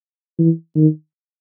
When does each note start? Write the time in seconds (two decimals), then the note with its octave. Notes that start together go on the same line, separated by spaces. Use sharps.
0.39 E3
0.76 D#3